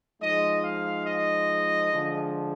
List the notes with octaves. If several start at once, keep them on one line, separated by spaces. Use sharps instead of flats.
F3 G#3 D#4 D#5
F5
D#5
D3 F3 G#3